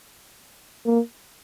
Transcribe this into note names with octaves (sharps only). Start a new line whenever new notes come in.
A#3